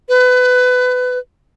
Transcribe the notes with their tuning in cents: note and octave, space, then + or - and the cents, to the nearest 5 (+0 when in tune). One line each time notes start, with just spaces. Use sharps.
B4 +25